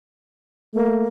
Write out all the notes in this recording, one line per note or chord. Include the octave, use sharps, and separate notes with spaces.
A3 A#3